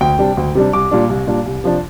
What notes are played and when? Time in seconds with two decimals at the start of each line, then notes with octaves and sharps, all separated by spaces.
0.01 D2 G5
0.19 C3 G3 D4
0.37 D2
0.55 C3 G3 D4
0.73 C2 D6
0.91 A#2 G3 D4
1.09 C2
1.27 A#2 G3 D4
1.45 C2
1.64 C3 F3 D4